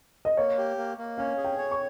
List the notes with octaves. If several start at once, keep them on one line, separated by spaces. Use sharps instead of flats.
D#5
A#3 C#5
G4
A#3
A#3
C#4 F5
G#4
G5
C#5
C#6